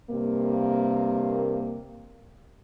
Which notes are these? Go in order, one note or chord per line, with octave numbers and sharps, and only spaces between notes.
G2 C3 A#3